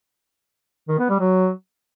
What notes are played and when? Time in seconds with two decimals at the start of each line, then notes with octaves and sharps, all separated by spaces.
0.89 D#3
0.99 B3
1.09 G3
1.20 F#3